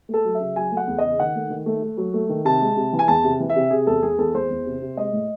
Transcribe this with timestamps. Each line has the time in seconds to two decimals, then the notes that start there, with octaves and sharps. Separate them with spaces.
0.09 A3 A4
0.25 F#3
0.35 E5
0.40 C#3
0.56 F#3 G#5
0.71 A3
0.77 F#5
0.87 E2
0.98 C#3 D#5
1.19 D#3 F#5
1.35 A3
1.50 D#3
1.66 A3
1.82 A3
1.98 F#3
2.14 A3
2.29 D#3
2.45 C3 A5
2.61 G#3
2.77 C3
2.93 E3
2.99 G#5
3.08 E2 A5
3.24 C3
3.40 E3
3.50 E5
3.56 C3
3.71 C3 G#4
3.87 E2 A4
4.02 E2 G#4
4.18 E2 A4
4.35 E2 C5
4.50 E2
4.66 C3
4.82 C3
4.97 G#3 D#5
5.13 A2